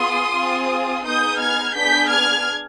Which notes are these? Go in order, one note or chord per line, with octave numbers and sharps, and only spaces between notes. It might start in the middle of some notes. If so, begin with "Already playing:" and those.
Already playing: B3 F4 G#4 C6 D#6
C4 F4 G#4
B3 D#4 G#4 D#6 G6
F6 G#6
B3 D4 G#4 G6 B6
F6 G#6